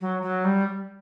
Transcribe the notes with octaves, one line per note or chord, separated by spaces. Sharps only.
F#3
F#3
G3